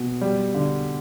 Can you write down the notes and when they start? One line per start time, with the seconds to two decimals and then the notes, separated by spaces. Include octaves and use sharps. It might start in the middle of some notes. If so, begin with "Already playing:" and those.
Already playing: B2
0.21 G3
0.54 D3